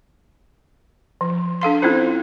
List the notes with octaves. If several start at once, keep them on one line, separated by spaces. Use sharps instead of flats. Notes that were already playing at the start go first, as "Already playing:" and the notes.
F3
D4 A4 F5 C6
C4 C#4 E4 F4 C5